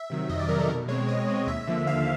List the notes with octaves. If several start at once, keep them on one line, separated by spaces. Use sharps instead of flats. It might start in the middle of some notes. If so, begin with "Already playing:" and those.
Already playing: E5
C3 D#3 F#3
F2 D#5
D5
C3 D#3 F#3 A#4
A4
B2 A#4
G#3 C4 C#5
B2 D#5
G#3 C4
D#2 E5
D3 F3 A#3
D#2 F5